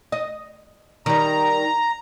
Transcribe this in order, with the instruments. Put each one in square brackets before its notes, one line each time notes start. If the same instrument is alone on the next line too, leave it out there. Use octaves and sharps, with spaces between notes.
[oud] D#5
[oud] D#3 G3 [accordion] A#5